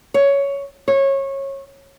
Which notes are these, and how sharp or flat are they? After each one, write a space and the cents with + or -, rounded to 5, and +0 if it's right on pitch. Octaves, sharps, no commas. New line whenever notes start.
C#5 +10
C#5 -20